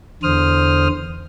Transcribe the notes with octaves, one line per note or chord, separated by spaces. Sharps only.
E2 D3 C5 D#6 F6